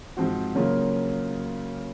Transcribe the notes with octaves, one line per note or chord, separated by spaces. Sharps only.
G#2 F3 C4 F#4
C#3 F#3 A#3 C#4 F4